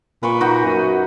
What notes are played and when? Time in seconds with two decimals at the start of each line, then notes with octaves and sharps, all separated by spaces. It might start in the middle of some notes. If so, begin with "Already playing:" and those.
0.23 A#2 B4 B5 C#6
0.41 D#4 F#4
0.64 F#2